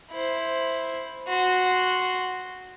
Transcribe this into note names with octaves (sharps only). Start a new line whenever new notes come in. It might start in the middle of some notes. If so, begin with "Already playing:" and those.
E4 C5
F#4 C6